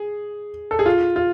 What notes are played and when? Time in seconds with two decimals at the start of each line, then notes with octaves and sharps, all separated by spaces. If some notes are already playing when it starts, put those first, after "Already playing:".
Already playing: G#4
0.71 A4
0.79 G#4
0.86 F4
1.16 F4